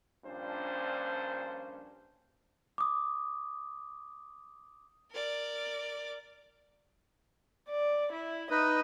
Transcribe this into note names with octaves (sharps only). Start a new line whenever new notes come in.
A#1 G2 A#2 C#4 D4 C5
D6 D#6
A#4 D5
D5
E4
D#4 B4 D#5